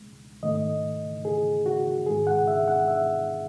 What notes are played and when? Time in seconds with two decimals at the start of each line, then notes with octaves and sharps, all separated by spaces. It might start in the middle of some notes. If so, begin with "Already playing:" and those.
Already playing: C#2 G#3
0.43 G#2 D#3 A3 D#5
1.25 G#4
1.66 F#4
2.06 G#2 D#3 G#3 G#4
2.27 F#5
2.48 E5
2.68 F#5
2.88 E5